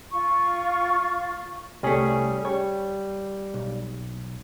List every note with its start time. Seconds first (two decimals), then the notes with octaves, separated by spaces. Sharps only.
0.11 F4 C#6
1.83 C2 G3 A3 C#4 G#4
2.45 G3 C#5
3.54 B1